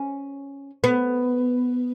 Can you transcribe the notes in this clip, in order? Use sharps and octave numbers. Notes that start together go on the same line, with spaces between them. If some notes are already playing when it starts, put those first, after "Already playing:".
Already playing: C#4
B3